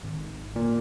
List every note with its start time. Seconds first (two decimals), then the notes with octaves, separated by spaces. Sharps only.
0.03 G#1
0.56 A#2